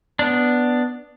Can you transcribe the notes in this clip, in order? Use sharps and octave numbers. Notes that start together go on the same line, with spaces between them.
B3 D4